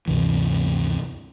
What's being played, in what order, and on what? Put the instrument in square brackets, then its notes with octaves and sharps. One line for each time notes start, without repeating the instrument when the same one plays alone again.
[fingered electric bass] D2 G2 C3 E3